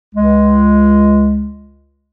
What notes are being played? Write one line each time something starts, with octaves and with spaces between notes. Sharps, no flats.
C#2 G#3